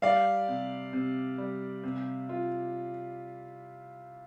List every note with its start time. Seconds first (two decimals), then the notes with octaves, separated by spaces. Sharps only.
0.02 G3 D5 F5
0.48 C3
0.93 C3
1.38 G3
1.84 C3
2.29 F4